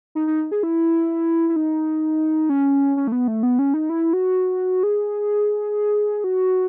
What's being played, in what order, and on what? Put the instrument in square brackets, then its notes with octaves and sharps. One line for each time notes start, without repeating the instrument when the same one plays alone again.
[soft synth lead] D#4
D#4
G#4
E4
E4
D#4
C#4
C#4
A3
B3
A3
B3
C#4
D#4
E4
F#4
G#4
F#4